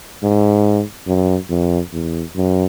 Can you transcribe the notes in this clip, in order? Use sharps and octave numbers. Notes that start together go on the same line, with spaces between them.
G#2
F#2
F2
E2
F#2